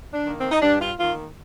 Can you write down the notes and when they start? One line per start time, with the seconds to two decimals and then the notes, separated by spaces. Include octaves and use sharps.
0.13 D4
0.26 D#3 A#3
0.38 C4
0.52 D#4
0.62 G2 D4
0.80 F4
0.98 D#3 A#3 F4